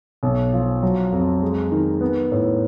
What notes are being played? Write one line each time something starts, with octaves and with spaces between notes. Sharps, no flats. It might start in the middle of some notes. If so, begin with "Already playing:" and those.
B1
F3
F#3
F2
G#3
D#3
B3
A2